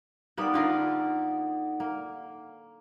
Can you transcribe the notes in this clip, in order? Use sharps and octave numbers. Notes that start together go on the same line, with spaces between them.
G3 A#3 B3 D#4 D5 F#5
D3 F4 A#4
A#3